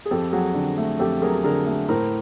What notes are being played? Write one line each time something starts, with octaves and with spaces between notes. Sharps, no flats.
G#4
F2 G4 A4
F#3 F#4 G#4
D3
A3
F2 G4 A4
F#3 G#4 A#4
D3 G#4 A#4
A3
A2 A#4 C5